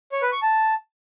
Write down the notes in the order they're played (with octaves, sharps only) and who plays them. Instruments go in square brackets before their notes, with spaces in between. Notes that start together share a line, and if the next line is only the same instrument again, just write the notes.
[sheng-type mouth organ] C#5
B4
C#6
A5